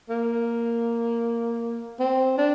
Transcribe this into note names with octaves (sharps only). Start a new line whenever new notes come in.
A#3
C4
D4